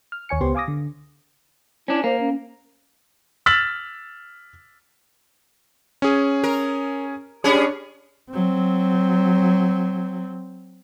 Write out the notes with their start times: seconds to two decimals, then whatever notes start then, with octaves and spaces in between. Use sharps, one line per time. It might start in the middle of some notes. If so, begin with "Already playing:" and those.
0.12 F6
0.29 D#2 C#5 G#5 C#7
0.41 C#2 B3 G4 C5 C6
0.55 F5 G#5 D6 D#6 A#6
0.68 D3
1.88 C#4 D4 E4
2.04 A#3 C5
2.20 C#4
3.46 E6 F6 A6 B6 F#7
6.02 C#4 G#4
6.43 A#4
7.44 G3 C#4 D4 G#4 C#5
8.31 F#3 C4